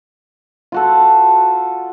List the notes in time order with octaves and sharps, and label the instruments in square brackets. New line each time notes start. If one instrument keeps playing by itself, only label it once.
[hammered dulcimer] F4 F#4 A4